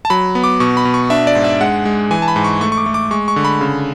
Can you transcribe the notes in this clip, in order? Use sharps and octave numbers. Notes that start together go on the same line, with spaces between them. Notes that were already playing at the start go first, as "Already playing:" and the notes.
A5
F#3 B5
B3
D6
B2 C#6
B5
B2
C#6
D4 E5
D5
G#2
E5
G#3 F#5
G#3
E3 G#5
A5
B5
G#2
C#6
A3 C#6
C#6
D6
A3
D6
G#3 C#6
C#6
D3
B5
C#3